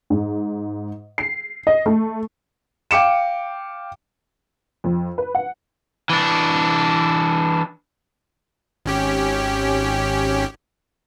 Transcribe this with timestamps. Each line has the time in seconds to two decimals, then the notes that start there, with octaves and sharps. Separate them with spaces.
0.10 G#2
1.18 C7
1.67 D#5
1.86 A3
2.91 F5 G5 D6 C#7 E7
4.84 F2
5.18 B4
5.35 F#5
6.10 E3 D4
8.86 G#1 C#4 G4